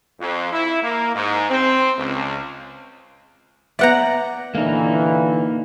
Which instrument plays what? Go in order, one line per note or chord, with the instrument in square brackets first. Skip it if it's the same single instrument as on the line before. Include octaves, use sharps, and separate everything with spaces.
[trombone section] F2
E4
A#3
G#2
C4
C#2
[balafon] B3 B4 E5 [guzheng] D5 F#5 A#5
[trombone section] A#2 D3 E3 [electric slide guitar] A#3 D#4